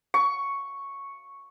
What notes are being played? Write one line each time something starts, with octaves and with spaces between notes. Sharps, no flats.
C#6